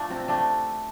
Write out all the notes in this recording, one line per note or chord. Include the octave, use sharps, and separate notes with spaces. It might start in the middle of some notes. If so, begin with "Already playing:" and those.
Already playing: F3 A3 D4 F4
C3 C4
C3 A3 D4